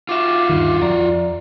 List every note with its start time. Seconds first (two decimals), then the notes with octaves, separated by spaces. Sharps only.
0.09 F4 F#4 E5 F5 D6
0.49 D2 G2 D#3
0.82 F2 D5 A#5